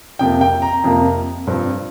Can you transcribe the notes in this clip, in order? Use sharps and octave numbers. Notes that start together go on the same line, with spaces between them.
F2 C3 A#3 G5
G5
A#5
F2 C3 A#3
G2 F3 C4